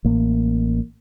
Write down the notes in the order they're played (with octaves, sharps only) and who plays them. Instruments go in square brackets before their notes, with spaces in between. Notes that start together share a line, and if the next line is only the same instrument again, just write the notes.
[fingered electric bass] A1 A2 A#3